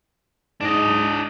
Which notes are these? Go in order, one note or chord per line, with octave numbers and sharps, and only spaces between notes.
G#2 D4 D#5